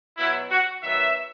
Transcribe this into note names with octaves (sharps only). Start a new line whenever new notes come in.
B2 F#3 B3 E4
F#4
D#3 F#3 B3 E5